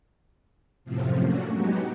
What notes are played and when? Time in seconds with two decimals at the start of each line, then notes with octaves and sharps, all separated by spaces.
0.84 F#2 A2 C3 F3
1.21 A3 A#3 C#4 D4 F#4
1.52 F#3 G#3 B3 D#4 F#4 G4